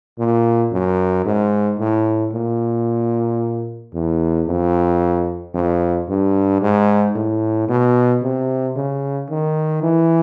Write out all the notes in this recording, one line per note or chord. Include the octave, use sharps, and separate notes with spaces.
A#2
F#2
G#2
A2
A#2
E2
F2
F2
G2
G#2
A2
B2
C3
C#3
D#3
E3